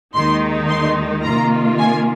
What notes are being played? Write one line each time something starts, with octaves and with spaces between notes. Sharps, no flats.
D#2 D#3 G#3 D#4 C6
C6
C3 D#3 A#3 F4 A#5
G#5